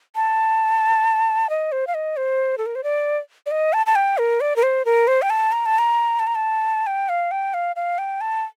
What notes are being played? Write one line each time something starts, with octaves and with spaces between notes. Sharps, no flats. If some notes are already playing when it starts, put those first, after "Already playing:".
A5
D#5
C5
F5
D#5
C5
A4
A#4
C5
D5
D5
D#5
A5
A5
G5
A#4
D5
A#4
C5
A#4
C5
G5
A5
A#5
A5
A#5
A5
A#5
A5
G5
F5
G5
F5
F5
G5
A5